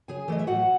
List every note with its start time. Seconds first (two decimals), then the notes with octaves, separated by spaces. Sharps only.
0.08 C#3 G#4 G#5
0.28 E3 A3 D#5
0.39 E5
0.47 A2 F#4 F#5